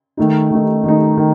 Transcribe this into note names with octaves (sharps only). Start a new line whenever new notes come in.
D#3 A3 D#4
D#3 A3 D#4
D#3 A3 D#4
D#3